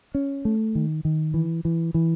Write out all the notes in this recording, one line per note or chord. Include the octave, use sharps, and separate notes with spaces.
C#4
A3
D#3
D#3
E3
E3
E3